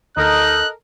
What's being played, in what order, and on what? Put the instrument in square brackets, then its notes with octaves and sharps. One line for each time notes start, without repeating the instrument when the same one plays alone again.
[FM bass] D2 [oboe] D#4 [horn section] A4 A#4 D#5 [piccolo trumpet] F#6